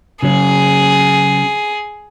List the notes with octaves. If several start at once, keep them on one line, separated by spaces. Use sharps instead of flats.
C#3 F#3 C#4 G#4